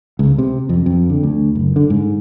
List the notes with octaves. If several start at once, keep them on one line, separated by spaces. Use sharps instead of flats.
C#2
C3
F2
F2
D3
D2
F#1
D3
G#2